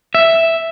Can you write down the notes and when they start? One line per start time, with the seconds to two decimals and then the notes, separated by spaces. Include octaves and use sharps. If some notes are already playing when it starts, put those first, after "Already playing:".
0.15 E5